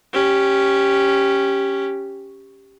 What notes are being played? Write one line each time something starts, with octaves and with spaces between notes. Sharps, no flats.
C#4 G4